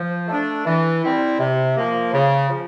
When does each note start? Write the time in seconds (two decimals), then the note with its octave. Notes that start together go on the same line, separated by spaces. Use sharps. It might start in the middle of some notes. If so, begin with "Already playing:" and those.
Already playing: F3
0.28 A3 D4
0.65 E3
1.02 G3 C4 E4
1.38 C3
1.76 F3 A#3
2.13 C#3
2.49 F3